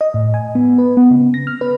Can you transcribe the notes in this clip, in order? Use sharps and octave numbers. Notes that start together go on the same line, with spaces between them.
D#5
A2
G#5
B3
B4
B3
C#3
A#6
F6
B4